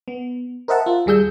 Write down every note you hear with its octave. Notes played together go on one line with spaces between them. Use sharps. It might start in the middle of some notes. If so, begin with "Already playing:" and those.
B3
A#4 C5 D#5 E5 F#5 A5
F4
D#2 G3 G#4 E6 G6